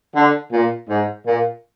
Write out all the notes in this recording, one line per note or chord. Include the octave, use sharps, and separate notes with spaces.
D3
A#2
G#2
A#2